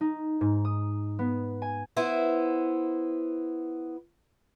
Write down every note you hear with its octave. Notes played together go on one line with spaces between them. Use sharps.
D#4
G#2
D#6
B3
G#5
B3 E4 C5